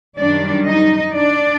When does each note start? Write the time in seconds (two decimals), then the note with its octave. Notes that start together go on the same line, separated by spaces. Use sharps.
0.18 F#2 D#3 G3 D4 D5
0.66 D#4 D#5
1.14 D4 D5